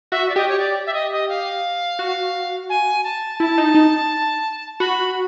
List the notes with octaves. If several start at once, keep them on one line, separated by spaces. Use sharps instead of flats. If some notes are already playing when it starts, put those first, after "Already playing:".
F#4 E5
D5
G4 D#5
C#5
D5
E5
D#5
D#5
F5
F#4
G#5
A5
E4 A5
D#4
D#4
F#4 B5